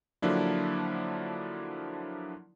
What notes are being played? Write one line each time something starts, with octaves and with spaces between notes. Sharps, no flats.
D3 F3 F#3 A#3 D4 E4